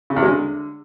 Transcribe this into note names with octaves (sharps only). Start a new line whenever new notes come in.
C#3
E2
G#3
D3